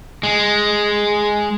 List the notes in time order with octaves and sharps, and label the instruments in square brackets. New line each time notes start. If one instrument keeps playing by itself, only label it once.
[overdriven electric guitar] G#3